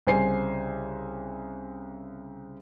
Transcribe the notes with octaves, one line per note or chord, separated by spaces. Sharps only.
C2 C#3 C5 G#5 C7